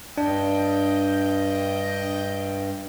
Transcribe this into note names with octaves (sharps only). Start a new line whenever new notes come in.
G2 D4 D#5 G5